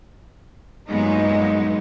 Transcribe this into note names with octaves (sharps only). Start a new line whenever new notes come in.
G2 A#2 F#3 G#3 B3 D#4